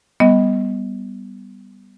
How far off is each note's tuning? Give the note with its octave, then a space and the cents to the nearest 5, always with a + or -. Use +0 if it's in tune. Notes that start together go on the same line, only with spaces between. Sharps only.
G3 +0 B3 +0 D#5 +20